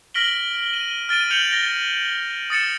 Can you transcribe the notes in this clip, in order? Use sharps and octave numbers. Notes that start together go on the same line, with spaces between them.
F6 A#6 B6 D7 F#7 G7
D#7
F6 A6 D7 D#7
F6 G6 C#7 F7 F#7
A6 A#6 G7
D#6 A6 C#7 E7